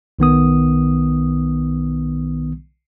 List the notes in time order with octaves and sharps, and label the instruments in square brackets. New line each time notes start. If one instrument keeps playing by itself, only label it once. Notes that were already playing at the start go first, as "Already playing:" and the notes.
[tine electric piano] B1 D#3 B3 D#6